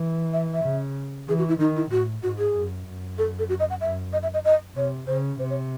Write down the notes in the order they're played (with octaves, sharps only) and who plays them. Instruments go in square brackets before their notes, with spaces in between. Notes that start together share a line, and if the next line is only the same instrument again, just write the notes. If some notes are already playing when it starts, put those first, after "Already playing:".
Already playing: [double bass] E3
[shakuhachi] E5
E5
[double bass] C#3
[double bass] E3 [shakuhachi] G#4
[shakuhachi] F#4
E4
[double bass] D#3 [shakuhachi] D#4
[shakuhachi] E4
[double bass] A2 [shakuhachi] F#4
[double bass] G#2 [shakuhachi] F#4
[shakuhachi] G#4
[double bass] F#2
F#2
[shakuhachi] A4
A4
F#4
D#5
F#5
[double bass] F#2 [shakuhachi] E5
[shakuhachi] D#5
E5
D#5
D#5
[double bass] C3 [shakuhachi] C#5
[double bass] C#3 [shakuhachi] C5
[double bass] C3 [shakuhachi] C5
[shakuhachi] C#5